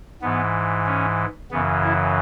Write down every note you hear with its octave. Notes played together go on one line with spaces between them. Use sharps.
G#2 E3 B3
C#4
F#2 C#3 E3 B3
E4